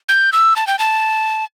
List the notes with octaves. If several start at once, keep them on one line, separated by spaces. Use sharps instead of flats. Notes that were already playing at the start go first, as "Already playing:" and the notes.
G6
E6
A5
G5
A5